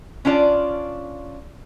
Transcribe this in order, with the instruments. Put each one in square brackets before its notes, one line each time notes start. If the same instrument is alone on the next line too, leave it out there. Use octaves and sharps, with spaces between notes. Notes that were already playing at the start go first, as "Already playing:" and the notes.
[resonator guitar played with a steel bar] C#4 D4 F4 D5